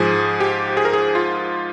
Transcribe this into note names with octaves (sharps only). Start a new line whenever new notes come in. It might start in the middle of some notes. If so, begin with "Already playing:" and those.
Already playing: G#2 F3 G#4
G4
G#4
A#4
G#4
F4